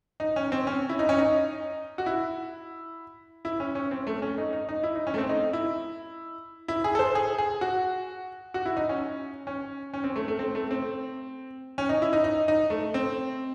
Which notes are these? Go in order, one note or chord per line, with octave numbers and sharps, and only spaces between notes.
D#4
C#4
C4
C#4
E4
D#4
C#4
D#4
F#4
E4
E4
C#4
C#4
C4
A3
C#4
D#4
D#4
D#4
E4
D#4
C#4
A3
C4
D#4
E4
E4
G#4
A4
C5
G#4
G#4
F#4
F#4
E4
D#4
C#4
C#4
C#4
C4
A3
A3
C4
A3
C4
C#4
D#4
E4
D#4
D#4
D#4
A3
C4